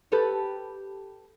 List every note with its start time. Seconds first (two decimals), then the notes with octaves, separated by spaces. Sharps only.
0.12 G4 A4 B4